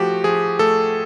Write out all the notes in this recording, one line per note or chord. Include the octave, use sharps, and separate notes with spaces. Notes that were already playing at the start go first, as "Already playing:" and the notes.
Already playing: F3 A3 F#4 G4
F3 G#4
A3 A4